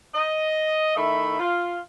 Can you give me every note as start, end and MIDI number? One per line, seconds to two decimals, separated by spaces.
0.15 0.94 75
0.96 1.38 51
0.96 1.38 57
0.96 1.38 64
0.96 1.38 76
0.96 1.38 83
1.39 1.79 65